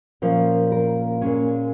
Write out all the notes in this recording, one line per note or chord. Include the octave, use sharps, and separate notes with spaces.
A#2 F3 C#4
A#4
A#2 G#3 C#4 C#5